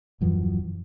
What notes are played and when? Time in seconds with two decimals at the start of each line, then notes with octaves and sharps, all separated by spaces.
0.21 D#1 F#2 E3 F3